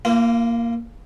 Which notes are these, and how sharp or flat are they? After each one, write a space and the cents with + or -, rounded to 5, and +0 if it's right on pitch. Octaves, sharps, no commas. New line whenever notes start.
A#3 +0 F4 -40